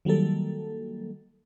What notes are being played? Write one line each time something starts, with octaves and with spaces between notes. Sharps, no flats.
D#3 F#3 G3 A#3 A4